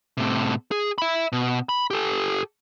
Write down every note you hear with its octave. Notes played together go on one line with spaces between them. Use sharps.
A2 C3
G#4
E5 B5
B2
B5
G4 A4